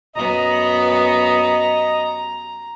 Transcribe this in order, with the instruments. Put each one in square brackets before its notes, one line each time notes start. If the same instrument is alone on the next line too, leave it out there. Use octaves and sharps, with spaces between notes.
[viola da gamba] F#2 B3 [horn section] D#5 [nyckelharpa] A#5